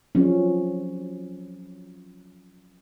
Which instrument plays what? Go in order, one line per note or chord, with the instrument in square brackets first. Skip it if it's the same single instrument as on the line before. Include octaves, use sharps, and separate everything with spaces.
[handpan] F3 F#3 C#4